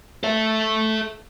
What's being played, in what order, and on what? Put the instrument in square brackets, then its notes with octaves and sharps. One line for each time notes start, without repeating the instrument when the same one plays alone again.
[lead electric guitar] A4 E5